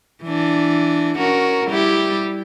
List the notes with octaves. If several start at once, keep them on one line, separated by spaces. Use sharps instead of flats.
E3 D4
C#4 F#4 A#4
G3 E4 G4